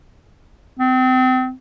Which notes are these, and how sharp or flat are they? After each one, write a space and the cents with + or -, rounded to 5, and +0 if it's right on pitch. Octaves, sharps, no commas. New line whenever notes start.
C4 -30